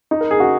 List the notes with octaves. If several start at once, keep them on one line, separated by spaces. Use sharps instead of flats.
D#4
A#4
G#4
F#4